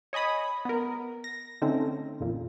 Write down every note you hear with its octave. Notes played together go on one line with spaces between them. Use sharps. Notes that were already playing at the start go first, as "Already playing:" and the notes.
C#5 D#5 G#5 B5 D#6
B3 A#4
A#6
D3 A3 C4 C#4 D#4
A1 F2 A#2